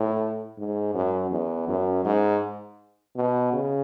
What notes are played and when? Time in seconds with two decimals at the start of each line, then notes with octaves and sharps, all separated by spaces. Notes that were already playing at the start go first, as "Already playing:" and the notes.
Already playing: A2
0.58 G#2
0.94 F#2
1.31 E2
1.68 F#2
2.05 G#2
3.16 B2
3.53 C#3